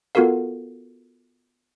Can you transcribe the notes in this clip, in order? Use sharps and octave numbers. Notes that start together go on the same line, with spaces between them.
B3 F4 F#4 A4 A#4 F5